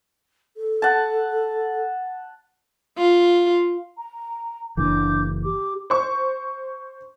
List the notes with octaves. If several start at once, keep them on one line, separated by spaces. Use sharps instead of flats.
A4
F#5 A5
F4
A#5
F#1 E3 D4 D6 G6
G4 D6
C5 C#6